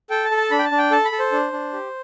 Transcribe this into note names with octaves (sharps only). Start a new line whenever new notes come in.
A4 G5
A5
A4
A5
D4 B5
G5
A5
D4
G5
A4 A5
B5
A4
C5
D4
D4
G4